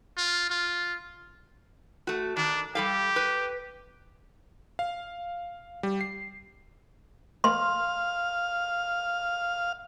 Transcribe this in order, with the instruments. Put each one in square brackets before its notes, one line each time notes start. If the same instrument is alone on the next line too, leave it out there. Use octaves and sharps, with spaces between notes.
[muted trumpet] F4
F4
[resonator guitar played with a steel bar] A3 F#4
[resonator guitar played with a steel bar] D#3 [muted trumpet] D4
[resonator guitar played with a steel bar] G3 A4 F5 [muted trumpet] G4
[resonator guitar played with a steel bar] B4
[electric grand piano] F5
G3
C7
[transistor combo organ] F5 [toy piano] C6